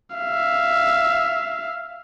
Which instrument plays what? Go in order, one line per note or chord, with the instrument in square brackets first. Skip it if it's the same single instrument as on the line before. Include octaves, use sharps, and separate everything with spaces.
[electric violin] E5 F5